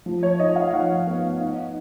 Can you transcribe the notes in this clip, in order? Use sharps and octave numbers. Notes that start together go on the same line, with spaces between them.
F3
C#5
D#4 D#5
F5
F3 F#5
B3
D#4